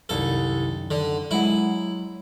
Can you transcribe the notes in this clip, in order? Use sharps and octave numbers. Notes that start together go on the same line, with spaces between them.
C2 F#2 D#3 A4
D3
F#3 G#3 E4 F#5